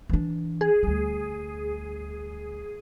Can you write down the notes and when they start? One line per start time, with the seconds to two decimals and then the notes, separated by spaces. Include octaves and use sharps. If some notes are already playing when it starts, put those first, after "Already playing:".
0.09 E3 D4
0.61 G#4
0.83 D2 G3